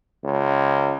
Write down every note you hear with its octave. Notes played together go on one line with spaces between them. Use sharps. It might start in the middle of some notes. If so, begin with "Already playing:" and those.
C#2